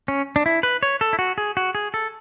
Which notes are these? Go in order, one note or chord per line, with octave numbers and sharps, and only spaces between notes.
C#4
D4
E4
B4
C#5
A4
E4
F#4
G#4
F#4
G#4
A4